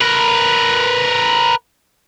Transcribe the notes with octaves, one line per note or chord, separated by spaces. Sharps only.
A#4 B4